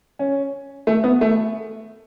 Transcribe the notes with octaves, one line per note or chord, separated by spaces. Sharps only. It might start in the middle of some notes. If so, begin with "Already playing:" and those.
C#4
A3
B3
A3